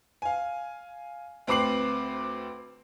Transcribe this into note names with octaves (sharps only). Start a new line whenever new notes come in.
F5 G#5
D2 C4 B4 D6 C7 F#7